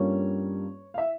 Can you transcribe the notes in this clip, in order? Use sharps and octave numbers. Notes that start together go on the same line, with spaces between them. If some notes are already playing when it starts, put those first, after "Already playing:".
Already playing: G2 G3 A#3 C#4 F4 C#5
F5
E5